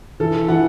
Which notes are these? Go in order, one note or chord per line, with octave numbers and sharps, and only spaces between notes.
E3 A4
E3 F#5